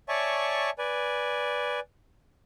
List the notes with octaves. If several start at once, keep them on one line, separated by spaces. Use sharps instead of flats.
C#5 D5 E5 G#5 A5 C#6
B4 D5 G#5